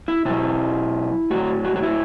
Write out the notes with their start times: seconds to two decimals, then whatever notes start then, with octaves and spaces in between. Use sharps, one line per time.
0.08 E4
0.25 B2 F#3 E4
1.30 A2 F#3 F#4
1.65 F#4
1.76 F#4
1.83 E4